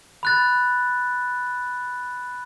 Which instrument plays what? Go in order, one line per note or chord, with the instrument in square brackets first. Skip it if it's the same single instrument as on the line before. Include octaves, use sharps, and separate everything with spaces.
[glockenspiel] B5 F#6 A6